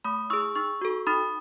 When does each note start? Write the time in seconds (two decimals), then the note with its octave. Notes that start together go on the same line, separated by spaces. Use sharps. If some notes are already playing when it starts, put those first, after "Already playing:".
0.05 A3 B5 D#6
0.30 E4 G#4 C#6 E6
0.55 D#4 C#6 E6
0.81 F#4 A4
1.07 D#4 B5 D#6